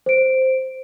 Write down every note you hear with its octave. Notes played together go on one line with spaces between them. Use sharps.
C5 D7